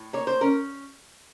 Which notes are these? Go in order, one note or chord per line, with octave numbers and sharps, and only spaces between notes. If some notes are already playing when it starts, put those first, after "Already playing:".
Already playing: A2
A#3 C#5
C5
C#4 A#4